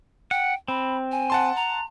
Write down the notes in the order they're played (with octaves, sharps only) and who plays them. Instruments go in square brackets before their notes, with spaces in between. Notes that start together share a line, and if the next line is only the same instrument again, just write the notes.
[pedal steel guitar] F#5 [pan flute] G5
[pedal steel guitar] C4 [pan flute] B5
[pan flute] G#5
[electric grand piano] F#5 A5 C6
[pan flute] A#5